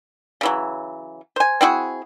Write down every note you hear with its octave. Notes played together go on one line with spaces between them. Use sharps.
C#3 E3 F#3
C5 G#5
C4 E4 F#4 G#4